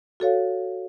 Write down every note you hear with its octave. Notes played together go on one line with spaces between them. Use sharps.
F#4 A4 C#5 F5